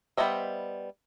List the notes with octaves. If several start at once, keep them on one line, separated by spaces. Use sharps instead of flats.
G3 B3 C5 D#5 E5